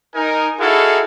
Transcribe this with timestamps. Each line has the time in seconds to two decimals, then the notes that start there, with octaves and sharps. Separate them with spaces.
0.15 D#4 A#4 G#5
0.60 D#4 E4 F#4 G#4 A4 F5